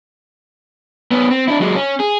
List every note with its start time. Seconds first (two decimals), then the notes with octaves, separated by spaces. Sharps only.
1.11 B3 C#4
1.31 C4
1.48 D4 E4
1.60 F#3 G#3
1.76 C#4
2.00 G#4